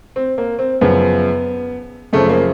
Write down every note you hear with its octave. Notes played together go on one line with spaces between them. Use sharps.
C4
A#3
C4
F#2 C#3 F3 B3
F#2 C#3 F3 A3
A#3